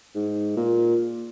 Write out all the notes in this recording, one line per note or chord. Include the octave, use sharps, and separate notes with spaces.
G#2
A#2